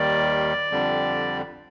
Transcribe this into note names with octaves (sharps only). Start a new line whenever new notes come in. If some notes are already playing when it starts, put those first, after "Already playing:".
Already playing: D#2 D#3 G3 D5
F2 D3 G3